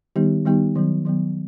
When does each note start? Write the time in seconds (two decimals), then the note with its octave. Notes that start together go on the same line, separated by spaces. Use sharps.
0.16 D#3 G3 B3 D#4 G4
0.45 D#3 G3 B3 D#4 G4
0.75 D#3 F#3 B3
1.05 D#3 F#3 B3